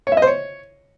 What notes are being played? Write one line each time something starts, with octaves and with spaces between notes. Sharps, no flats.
C#5
E5
D#5
C5
C#5